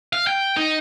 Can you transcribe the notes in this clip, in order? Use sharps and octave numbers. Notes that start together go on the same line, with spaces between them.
F5
G5
D#4